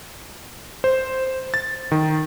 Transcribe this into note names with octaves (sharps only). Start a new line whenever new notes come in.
C5
A6
D#3